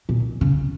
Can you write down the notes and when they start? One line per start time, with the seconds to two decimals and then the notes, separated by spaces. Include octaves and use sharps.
0.09 A#2
0.41 C#3